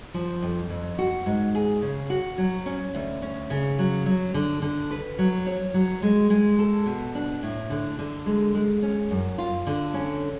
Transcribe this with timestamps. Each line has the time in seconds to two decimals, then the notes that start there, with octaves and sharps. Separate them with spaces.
0.14 F3
0.42 F2
0.70 F2
0.99 F#4
1.26 G#2
1.55 G#4
1.82 C#3
2.10 F#4
2.38 F#3
2.66 C#4
2.95 D2
3.22 C#4
3.50 C#3
3.79 F#3
4.06 F#3
4.34 D3
4.62 D3
4.91 B4
5.19 F#3
5.47 C#5
5.74 F#3
6.02 G#3
6.30 G#3
6.59 A4
6.86 B2
7.15 D4
7.43 A2
7.70 D3
7.99 D3
8.26 G#3
8.54 G#3
8.82 C#4
9.11 F#2
9.38 F4
9.67 D3
9.94 C#4